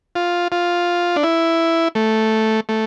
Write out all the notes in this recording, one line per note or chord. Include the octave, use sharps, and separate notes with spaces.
F4
F4
D4
E4
A3
A3